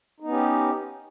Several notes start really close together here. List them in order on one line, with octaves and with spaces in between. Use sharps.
D#4 B3 C#4 G4